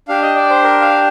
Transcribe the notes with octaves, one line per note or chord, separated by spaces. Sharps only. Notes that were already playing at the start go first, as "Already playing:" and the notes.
D4 G4 F5
D#5
D5
C5
A#4
F5